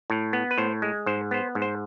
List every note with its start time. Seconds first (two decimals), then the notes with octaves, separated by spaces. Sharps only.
0.10 A2
0.33 B3
0.51 B4
0.58 A2 C5
0.82 G#3
1.06 G#2 C5
1.31 B3 C5
1.55 G#2
1.62 C5